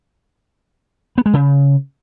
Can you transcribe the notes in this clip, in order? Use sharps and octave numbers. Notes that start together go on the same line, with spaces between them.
B3
G#3
C#3